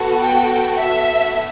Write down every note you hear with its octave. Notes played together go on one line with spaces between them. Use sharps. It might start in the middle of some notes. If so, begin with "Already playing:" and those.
Already playing: B3 F#4 A4
G5
E5